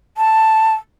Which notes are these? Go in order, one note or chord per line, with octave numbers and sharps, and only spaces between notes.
A5